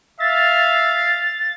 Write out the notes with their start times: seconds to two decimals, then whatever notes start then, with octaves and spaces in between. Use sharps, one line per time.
0.20 E5 F5 A6